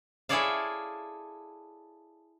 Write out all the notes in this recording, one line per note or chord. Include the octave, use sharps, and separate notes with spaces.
E4 G#4 A4 C#5 D5 F5